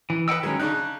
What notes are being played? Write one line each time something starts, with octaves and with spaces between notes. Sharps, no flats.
E3
B4 D#5 F#5 G5 E6
D#3 F#3 G#3 C#4
C#3 D4 D#4 F#6